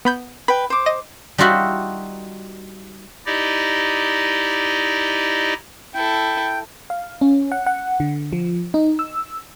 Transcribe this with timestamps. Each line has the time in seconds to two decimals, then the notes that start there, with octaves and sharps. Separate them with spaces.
0.05 B3 B5 G6
0.48 B4 G5 B5
0.70 C5 D6
0.86 D#5 A#6 D#7
1.38 G3 D#4 F4 F#4 E5 F#5
3.26 D#4 E4 G4 D5 D#5
5.94 E4 A4 G5
6.90 F5
7.21 C#4
7.52 F#5
7.66 F#5
8.00 D3
8.33 F3
8.74 D#4
8.99 E6